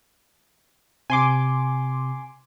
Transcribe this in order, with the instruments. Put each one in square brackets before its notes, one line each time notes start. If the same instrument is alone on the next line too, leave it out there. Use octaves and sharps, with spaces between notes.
[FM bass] C3 [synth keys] G#5 C6 D6